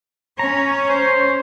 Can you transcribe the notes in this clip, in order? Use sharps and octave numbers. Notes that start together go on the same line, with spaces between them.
C#4 C#5 A#5
C5